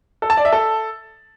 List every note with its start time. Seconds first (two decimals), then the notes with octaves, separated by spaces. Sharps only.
0.22 A4
0.30 A5
0.37 D5
0.45 E5
0.52 A4